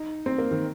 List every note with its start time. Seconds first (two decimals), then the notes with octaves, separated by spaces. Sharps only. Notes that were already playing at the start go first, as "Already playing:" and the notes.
Already playing: D#4
0.26 C4
0.38 A#3
0.51 D#3